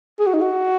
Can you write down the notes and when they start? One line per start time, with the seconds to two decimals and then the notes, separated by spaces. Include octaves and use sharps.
0.19 G#4
0.27 F#4
0.34 D#4
0.41 F#4